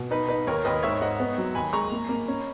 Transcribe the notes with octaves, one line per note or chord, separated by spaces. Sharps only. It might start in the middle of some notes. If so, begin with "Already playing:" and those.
Already playing: B2
D#4 B4
D#4 B4
D#2 A#4 C#5
D#2 B4 D#5
G#2 C#5 E5
G#2 D#5 F#5
B3
F#3
D#2 G#5 B5
G#3 A#5 C#6
A#3
A#3
C#4